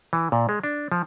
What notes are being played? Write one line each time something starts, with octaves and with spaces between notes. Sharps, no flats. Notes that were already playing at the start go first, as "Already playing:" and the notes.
E3
A#2
G#3
D4
F3